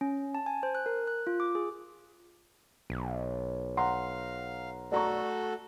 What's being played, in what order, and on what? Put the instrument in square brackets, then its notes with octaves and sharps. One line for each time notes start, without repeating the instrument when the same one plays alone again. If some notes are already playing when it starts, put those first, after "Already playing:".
[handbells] C#4
A5
G#5
C5
F#6
A#4
F#6
F4
D6
G#4
[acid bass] B1
[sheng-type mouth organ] F5 [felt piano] F#5 A#5 C6
[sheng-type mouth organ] A3 F#4 A4 [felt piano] D5 A#5 C#6